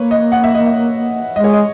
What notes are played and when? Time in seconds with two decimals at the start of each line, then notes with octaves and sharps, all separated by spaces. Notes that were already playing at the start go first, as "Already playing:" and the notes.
Already playing: A#3 B4 C#5
0.11 D#5
0.32 F#5
0.44 E5
0.55 D#5
0.66 E5
1.36 G#3 D#5
1.44 C#5
1.53 D#5